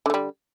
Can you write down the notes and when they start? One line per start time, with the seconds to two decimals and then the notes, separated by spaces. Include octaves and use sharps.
0.06 D3
0.10 A3
0.14 G3